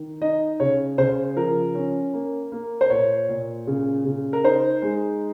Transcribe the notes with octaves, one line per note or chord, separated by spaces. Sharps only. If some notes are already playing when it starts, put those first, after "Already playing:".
Already playing: D#3
D#4 D#5
C#3 C#5
C#3 C5
F3 A#4
C#4
A#3
A#3
C5
A#2 C#5
A#2
C#3
C#3
A#4
D#4 C5
G#3